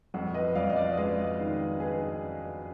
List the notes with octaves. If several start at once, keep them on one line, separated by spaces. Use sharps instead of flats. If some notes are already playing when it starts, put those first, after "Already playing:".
F2 F#4
B4 D#5
F2 D5 F5
D#5
D5 F5
G#3 B4 D#5
D#3
G#4 B4